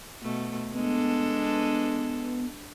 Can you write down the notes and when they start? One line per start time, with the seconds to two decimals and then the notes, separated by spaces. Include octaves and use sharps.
0.21 B2 A3
0.74 G#3 B3 D4 A4